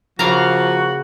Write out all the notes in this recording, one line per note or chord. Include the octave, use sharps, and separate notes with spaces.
C#3 F3 A#3 F#4 F5 A#5